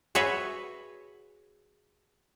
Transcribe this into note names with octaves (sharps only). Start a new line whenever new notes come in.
F#4 G#4 B4 C#5 E5